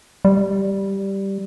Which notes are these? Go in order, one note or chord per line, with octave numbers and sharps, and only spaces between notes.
G3